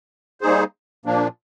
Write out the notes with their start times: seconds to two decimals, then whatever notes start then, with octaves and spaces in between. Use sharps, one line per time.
0.41 G3 A#3 D#4 G#4 C5
1.05 A#2 F3 A#3 D4